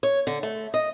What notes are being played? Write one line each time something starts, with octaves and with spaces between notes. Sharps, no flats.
C#5
D3
A3
D#5